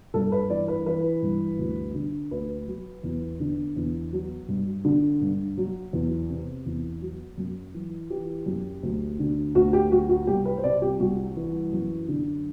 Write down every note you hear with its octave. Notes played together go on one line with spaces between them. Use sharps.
G2 A4
B4
E3 D5
B4
E3 B4
G2
D2
D3
D2 B4
F#3
E2
D3
E2
F#3
G2
D3
G2
F#3
E2
C3
E2
F#3
F#2
E3
E3 G4
F#2
D2
D3
D2 F#4
G4
F#3 F#4
F#4
C2 G4
B4
C5
C3 D5
G4
C2 F#4
E3
F#2
D3